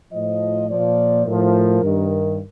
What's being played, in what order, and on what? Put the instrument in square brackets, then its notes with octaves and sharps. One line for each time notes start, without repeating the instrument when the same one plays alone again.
[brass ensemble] A2 F3 D#5
A#2 F3 D5
A2 F3 A#4
G2 D#3